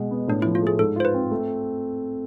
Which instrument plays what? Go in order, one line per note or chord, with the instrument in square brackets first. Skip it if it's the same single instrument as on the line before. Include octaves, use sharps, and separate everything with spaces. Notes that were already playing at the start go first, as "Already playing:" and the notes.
Already playing: [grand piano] B2 G#3
B3
[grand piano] A2 [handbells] D4
[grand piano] F3 [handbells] E4
[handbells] F4
[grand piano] A3 [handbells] G#4
[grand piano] G#2 [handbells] A4
[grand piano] F4 [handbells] C5
[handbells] B4
[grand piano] C4
A3